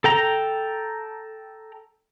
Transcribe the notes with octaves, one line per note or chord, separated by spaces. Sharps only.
A4 G5 A#5